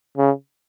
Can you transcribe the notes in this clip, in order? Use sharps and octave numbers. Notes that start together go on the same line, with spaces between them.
C#3